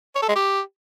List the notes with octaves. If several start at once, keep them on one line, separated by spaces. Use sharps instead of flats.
C#5
A4
G#3
G4